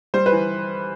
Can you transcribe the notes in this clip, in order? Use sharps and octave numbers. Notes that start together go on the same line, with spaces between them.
G3 C5
B4
E3